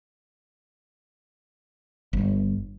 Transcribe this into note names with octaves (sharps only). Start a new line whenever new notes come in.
G1